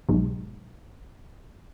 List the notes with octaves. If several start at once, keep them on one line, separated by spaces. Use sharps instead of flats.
B1 G#2